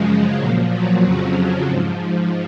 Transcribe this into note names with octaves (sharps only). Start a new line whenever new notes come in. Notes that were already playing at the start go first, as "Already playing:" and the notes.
Already playing: F#2 C#3 F3 G#3
A#2 F3 F#3
F#3
F2 C#3 F3 F#3
G#2 F3